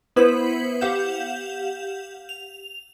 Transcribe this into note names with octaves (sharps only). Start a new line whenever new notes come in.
B3 E4 B4 C5 B6 F#7
G4 F5 F#5 G6 E7
F7